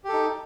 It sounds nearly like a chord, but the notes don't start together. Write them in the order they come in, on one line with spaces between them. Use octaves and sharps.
G4 A4 D#4